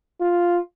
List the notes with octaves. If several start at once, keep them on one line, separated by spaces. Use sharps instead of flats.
F4